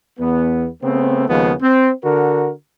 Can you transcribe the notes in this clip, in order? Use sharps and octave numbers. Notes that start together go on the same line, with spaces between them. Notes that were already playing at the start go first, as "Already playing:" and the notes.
E2 B3
C#3 A3 B3 C4
D#2 C#3 F3 G#3 B3
C4
D3 F#4 A#4